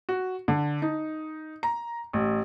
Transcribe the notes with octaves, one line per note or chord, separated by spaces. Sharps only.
F#4
D3
D#4
A#5
A1